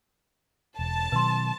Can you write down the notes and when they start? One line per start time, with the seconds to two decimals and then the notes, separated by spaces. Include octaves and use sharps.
0.79 E1 A5
1.12 B2 D#3 F#3 B4 C6